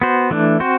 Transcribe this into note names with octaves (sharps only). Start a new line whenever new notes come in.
B3 F#4 C5
E3 A3 D4
C4 F#4 C5